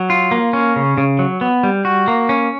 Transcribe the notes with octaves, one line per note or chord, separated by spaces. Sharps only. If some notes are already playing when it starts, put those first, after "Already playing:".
Already playing: F#3
F4
A#3
C#4
C#3
C#3
F#3
B3
G3
F#4
A#3
C#4